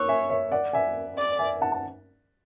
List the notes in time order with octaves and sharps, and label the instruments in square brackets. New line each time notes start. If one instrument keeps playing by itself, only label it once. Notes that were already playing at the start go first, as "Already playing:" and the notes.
Already playing: [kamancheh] C#5 [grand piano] D6 E6 F#6
[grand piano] E5 G#5
C#5 E5
D5 F#5
E5 G#5
[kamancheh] D5
[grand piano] E5 G#5
F#5 A5
A5